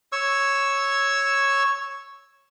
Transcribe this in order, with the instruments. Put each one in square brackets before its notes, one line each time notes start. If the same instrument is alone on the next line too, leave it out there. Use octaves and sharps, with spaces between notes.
[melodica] C#5 C#6 E6